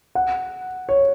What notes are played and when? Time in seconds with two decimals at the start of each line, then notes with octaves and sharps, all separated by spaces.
0.15 F#5
0.89 C#5